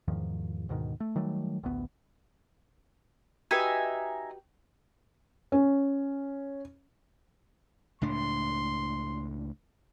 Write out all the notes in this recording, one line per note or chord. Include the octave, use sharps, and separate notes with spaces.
E2 G#2 D#3 F3
D2 G#2 B2 D#3
A3
D#3 F#3 G3 A3
A1 D2 B3
D#4 F#4 G4 B4 E5 G#5
C#4
C#2 A2 D4 C6